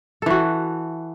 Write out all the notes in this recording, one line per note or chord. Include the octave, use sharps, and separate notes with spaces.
E3 F#4 A4